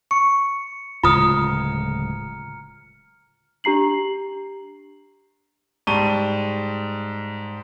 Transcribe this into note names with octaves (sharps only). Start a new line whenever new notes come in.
C#6 C#7
D1 C#3 G#3 F4 A#5 D#6 F6 C#7
D4 G4 A#5 C7 F#7
G#2 G3 A5 C#6 D#7 G7